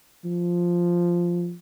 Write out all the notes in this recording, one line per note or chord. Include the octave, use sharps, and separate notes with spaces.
F3